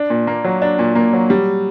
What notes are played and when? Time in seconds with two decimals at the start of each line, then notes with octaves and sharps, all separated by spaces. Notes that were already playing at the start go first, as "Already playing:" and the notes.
Already playing: D4
0.10 A#2
0.27 A#3
0.44 F#3
0.62 D4
0.79 A#2
0.95 A#3
1.13 F#3
1.30 G3